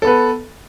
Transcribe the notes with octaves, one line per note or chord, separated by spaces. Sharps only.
B3 A4 B4